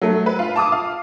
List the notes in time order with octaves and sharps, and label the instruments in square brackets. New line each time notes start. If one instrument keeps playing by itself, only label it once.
[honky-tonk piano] F#3 A3
B4
F4
A5 D6 D#6
F5